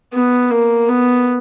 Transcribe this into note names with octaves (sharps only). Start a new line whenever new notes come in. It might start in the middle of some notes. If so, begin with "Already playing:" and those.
B3
A#3
B3